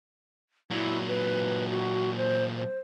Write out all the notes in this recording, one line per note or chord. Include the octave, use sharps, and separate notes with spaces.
A#2 F#3 E4
B4
F#4
C5
C5